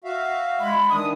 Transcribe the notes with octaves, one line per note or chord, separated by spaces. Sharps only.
F#4 E5 F5
G#3 B5
D#3 E3 D4 D#6